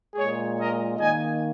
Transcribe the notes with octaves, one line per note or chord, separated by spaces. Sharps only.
A#2 G#3 G#4 C#5
A#4 D#5
D#3 A#3 D#5 G#5